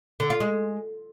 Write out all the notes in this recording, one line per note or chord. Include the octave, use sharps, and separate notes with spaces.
D3
F4
G#3